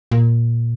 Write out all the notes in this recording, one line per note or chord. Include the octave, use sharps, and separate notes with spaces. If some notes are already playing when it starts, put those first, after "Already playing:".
A#2